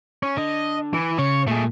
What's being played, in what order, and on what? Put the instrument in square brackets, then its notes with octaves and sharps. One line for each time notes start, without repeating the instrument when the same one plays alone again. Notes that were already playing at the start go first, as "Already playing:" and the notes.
[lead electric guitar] C#4
[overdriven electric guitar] D3 [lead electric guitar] D#5
[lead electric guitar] E3
[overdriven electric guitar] C#3 [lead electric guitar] C#5
[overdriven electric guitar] A#2 [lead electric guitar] A3 G#4